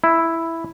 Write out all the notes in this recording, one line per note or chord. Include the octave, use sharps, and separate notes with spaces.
E4